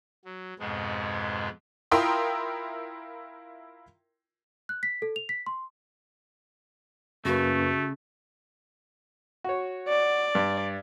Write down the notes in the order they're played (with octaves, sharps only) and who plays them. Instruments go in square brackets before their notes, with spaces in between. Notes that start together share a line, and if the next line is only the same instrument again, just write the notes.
[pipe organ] F#3
F2 G#2 B2 G#3 B3
[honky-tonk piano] E4 F4 A#4 G5 C6 D#6
[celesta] F#6
B6
A4
F7
B6
C6
[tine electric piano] F#2 A#3 B4 [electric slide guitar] C#3 [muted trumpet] A3 [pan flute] F#4
[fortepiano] F#4 C#5
[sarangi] D5
[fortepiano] G2